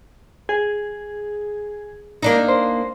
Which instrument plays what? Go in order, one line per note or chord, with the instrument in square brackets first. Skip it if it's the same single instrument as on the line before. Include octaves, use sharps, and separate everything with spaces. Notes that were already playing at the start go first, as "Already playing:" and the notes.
[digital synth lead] G#4
[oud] A#3 D4 D#4
[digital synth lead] C5